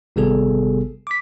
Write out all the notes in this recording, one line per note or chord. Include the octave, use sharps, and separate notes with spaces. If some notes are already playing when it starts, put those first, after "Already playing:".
G#1 C3 G3 B3 G#4 A4
D6 B6